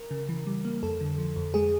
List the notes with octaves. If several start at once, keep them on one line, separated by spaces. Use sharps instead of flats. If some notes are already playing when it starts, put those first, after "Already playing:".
Already playing: A#4
C#3
E3
G3
A#3
F2 A4
D3
F3
F2
G#3 G#4